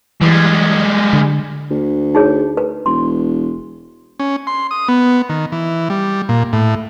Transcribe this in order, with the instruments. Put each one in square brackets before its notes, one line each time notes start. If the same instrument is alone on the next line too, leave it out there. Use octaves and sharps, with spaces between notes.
[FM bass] E3 [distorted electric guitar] G3 G#3
[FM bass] D3
[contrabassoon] D2
[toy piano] D#4 G#4 C#5
B4
[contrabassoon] E1 [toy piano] C6
[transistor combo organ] C#4
C6
D#6
B3
D#3
E3
G3
A#2
A2